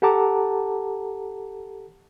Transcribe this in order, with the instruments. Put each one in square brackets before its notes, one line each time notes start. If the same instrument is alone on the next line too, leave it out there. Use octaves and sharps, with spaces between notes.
[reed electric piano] G4 A4 F#5 A5 A#5 D6